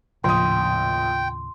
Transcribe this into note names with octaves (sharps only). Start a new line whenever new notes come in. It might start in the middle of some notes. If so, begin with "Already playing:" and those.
A#1 D#2 A2 C#3 G5 C6 D#6